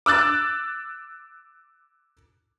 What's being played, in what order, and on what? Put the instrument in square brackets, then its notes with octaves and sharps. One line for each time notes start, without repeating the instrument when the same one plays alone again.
[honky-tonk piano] D6 E6 F#6 A6